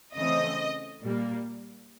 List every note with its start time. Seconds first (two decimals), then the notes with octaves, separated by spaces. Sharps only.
0.15 C#3 E3 A3 C4 D#5
1.02 A#2 G3 A#3